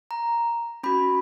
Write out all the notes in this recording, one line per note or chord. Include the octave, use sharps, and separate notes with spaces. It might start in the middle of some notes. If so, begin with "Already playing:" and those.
A#5
C#4 F#4 B5